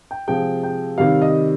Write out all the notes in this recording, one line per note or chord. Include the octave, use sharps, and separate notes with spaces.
G5
C3 F3 G#3 G5
G5
C3 D#3 G3 F5
D#5